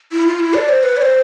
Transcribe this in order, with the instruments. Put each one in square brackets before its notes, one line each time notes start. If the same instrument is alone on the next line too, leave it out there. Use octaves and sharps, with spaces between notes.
[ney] E4
F4
E4
D5
C5
B4
D5
C5